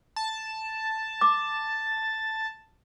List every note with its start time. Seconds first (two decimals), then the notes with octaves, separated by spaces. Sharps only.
0.16 A5
1.21 D6